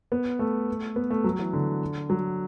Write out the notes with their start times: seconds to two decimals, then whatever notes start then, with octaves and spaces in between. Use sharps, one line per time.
0.12 B3
0.39 A3
0.96 B3
1.11 A3
1.24 F#3
1.39 E3
1.53 D3
2.10 F#3